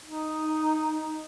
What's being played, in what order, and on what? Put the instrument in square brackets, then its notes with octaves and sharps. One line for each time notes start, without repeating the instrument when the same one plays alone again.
[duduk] D#4